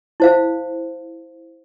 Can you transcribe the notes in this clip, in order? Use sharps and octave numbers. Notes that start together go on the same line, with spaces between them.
E4 C5 F5